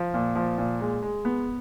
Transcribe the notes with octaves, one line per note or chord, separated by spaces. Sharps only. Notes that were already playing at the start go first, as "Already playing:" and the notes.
Already playing: F3
A#2
F3
A#2
G#3
G#3
B3